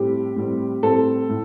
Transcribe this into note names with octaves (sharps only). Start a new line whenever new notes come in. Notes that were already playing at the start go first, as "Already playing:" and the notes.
Already playing: A2 G3 C4 G4
A2 G3 C4
A2 G3 C4 A4
A2